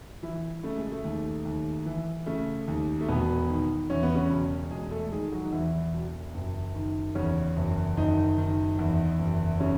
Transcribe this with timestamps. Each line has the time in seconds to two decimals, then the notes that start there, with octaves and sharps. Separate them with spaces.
0.23 E3 E4
0.64 C#3 A3
0.78 G#3
0.92 A3
1.05 D#2
1.45 D#2
1.86 E3
2.26 C#3 A3
2.68 D#2
3.01 A3
3.08 E1 B2 B3
3.49 D#3
3.90 E2 C#4
4.03 B3
4.15 C#3 C#4
4.30 E1
4.71 E1 G#3 G#4
4.91 A3 A4
5.12 D#3 G#3 G#4
5.32 F#3 F#4
5.45 D#4
5.53 E2 E3 E4
5.94 E1
6.34 F#1
6.75 D#3
7.15 E2 C#3 C#4
7.57 F#1
7.97 F#1 D#3 D#4
8.38 D#3
8.79 E2
9.19 F#1
9.60 C#3 C#4